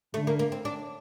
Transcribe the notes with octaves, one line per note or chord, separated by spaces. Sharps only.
D3 A3
A#3
A#3
C4
D4